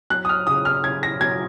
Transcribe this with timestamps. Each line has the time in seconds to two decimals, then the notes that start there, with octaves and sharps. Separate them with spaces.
0.10 F#3 F#6
0.25 D#6
0.29 F6
0.47 C#3 D#6
0.65 F6
0.84 C#3 G#6
1.03 A#6
1.21 F#3 G#6